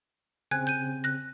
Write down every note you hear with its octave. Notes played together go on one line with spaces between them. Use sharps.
C#3 C4 G#5 F#6 G#6
G6 D#7
F#6 A#6